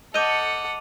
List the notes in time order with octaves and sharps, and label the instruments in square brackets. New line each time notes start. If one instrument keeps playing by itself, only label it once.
[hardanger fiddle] A4 F#5 [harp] D#5 G6 [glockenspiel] D6 D#7 F7